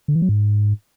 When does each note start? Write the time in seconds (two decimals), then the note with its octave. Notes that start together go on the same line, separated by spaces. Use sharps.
0.08 D3
0.15 E3
0.22 F#3
0.29 G#2